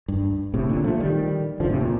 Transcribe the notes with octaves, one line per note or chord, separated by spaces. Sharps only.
G2
A2 C3
A#2 D3
F3 A3
D#3 G3
D3 F3
A2 C3
A#2